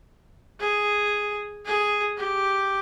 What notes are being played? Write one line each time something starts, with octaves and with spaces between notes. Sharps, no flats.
G#4
G#4
G4